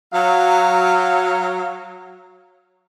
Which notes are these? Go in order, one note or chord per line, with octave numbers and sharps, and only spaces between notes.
F#3 F5